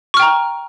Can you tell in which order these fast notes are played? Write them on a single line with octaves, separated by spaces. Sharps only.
C#6 F6 G5 A#5